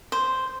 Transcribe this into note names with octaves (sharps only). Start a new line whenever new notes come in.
C5